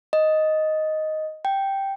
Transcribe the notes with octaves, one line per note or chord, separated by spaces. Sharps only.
D#5
G5